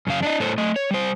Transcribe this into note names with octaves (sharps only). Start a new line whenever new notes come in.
F#2 C#3 F5
D4 D5 D#5
A2 A4 C5 C#5
A3 D#5
C#5
G3 C5